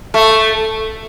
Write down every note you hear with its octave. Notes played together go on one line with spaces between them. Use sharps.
A3